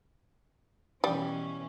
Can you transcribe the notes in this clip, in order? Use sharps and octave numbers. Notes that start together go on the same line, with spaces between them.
B2 E3 G3 C#4